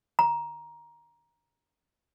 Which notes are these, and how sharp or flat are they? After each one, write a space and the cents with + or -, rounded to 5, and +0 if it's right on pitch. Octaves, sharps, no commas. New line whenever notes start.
A#5 +15